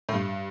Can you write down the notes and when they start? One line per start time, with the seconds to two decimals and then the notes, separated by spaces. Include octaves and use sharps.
0.09 A2
0.13 G2